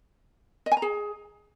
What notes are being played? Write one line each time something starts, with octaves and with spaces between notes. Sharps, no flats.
D#5
G#5
A#5
G#4